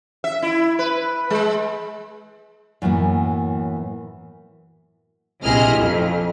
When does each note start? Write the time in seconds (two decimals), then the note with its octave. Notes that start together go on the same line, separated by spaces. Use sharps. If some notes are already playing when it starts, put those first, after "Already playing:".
0.24 E5
0.42 E4
0.79 B4
1.30 G#3
2.82 F#2 A2 E3 A#3 B3
5.43 A#1 C3 E4 G#4 D#5 F6
5.75 F2